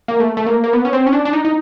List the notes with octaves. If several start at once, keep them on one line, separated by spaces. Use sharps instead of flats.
A#3
A3
A3
A#3
A#3
B3
C#4
C4
C#4
D4
D4
D#4
D#4